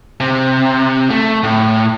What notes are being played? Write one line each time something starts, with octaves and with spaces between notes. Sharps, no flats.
C3
A3
A2